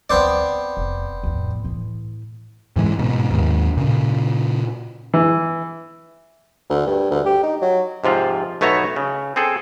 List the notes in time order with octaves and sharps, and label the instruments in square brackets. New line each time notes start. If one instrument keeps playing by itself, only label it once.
[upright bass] D2 G3 [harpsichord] B3 C4 D5
[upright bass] F1
F2 A2
A2 E3
[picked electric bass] G#2 E3 G#3
G#2 B2
D#2 G#2
A#2 C#3
[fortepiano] E3
[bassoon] D2
G2
D2
G4
D#4
F#3
[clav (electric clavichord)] G#2 C3 F3 F4
B1 A3 B3 C#5 E5 A#5
C#3
C4 G#4 A4